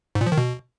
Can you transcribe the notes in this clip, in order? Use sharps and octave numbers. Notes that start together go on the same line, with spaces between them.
G#2
A#2
F3
D#3
B2